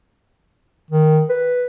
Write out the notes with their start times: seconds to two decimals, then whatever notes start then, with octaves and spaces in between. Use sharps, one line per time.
0.90 D#3
1.29 B4